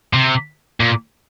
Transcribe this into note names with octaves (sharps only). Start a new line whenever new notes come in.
C3
A#2